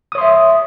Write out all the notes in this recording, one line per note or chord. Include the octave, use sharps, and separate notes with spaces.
C#5 E5 C6 D#6